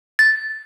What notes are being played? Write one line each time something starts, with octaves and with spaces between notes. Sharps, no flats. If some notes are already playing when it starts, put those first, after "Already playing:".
A6